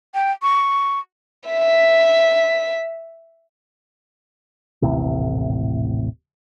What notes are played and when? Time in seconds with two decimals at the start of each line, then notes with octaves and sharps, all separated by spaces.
0.14 G5
0.42 C#6
1.48 E5 B6
4.82 D#1 A1 A2 C3